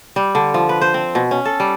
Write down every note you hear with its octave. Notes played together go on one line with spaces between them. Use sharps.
G3
D3
F3
B4
C5
C4
B2
C#4
A4
G3